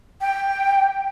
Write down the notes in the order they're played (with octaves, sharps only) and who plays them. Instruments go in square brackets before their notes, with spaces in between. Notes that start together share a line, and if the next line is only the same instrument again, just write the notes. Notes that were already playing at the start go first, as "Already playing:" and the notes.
[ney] G5